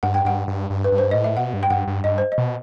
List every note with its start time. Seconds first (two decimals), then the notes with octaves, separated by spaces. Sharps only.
0.03 G2 F#5
0.14 G5
0.25 G2 F#5
0.48 G2
0.70 G2
0.84 B4
0.92 G2
0.98 C5
1.11 A2 D#5
1.24 E5
1.37 B2 F#5
1.53 G2
1.63 G5
1.70 G2 F#5
1.87 G2
2.04 G2 D#5
2.18 C5
2.32 D#5
2.38 B2